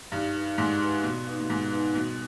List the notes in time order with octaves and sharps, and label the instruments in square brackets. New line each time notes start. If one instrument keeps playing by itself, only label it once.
[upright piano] G2 [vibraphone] D#4
[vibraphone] G4 B4
[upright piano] G#2 [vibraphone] D#4
[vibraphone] G4 B4
[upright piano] B2 [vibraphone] B3
[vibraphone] D#4 B4 F5
[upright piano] B2
[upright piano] G#2 [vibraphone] B3
[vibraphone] D#4 B4 F5
[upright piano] B2 [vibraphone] G3